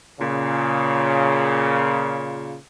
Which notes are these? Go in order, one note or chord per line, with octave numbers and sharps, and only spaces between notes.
A#2 C#3